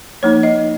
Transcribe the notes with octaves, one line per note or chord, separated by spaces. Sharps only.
F3 A#3 D#4 C#5
D#5